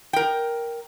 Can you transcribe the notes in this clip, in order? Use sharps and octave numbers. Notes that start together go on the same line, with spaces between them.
A#4 G5